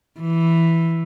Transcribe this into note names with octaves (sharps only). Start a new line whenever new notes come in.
E3